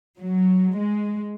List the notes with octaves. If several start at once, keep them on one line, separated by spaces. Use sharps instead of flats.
F#3
G#3